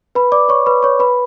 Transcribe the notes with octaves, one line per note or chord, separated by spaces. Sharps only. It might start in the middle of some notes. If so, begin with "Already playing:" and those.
B4 B5
D5 D6
C#5 C#6
B4 B5
C#5 C#6
B4 B5